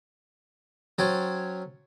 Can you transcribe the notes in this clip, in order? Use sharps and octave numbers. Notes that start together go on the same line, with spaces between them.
F#3 C#4 C5 C#5 G5 A5